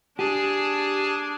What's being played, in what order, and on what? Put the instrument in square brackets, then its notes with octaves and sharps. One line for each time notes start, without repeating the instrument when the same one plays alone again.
[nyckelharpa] D4 [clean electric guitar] G4 [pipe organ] G#4 G#5 A5